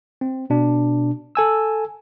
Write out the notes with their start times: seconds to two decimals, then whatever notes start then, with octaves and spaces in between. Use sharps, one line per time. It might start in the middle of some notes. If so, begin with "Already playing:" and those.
0.21 C4
0.50 B2 D4
1.35 A4 G#5 E6